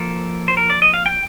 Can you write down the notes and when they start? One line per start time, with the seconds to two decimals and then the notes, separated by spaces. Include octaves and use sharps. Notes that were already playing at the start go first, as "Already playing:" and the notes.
Already playing: F3 A#3 A4
0.48 C5
0.57 A#4
0.70 D5
0.82 D#5
0.94 F5
1.06 G5